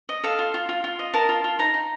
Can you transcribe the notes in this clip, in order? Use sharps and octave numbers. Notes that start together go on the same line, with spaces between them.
D#5
A4 F5
F4
F4
F4
F4
D#5
A#4 A5
F4
F4
D#4 A#5
D#4